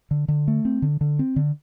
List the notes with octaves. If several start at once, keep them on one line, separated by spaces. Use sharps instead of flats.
D3
D3
A3
C4
D3
D3
C4
D3